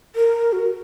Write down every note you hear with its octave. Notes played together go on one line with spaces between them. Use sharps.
A#4
F#4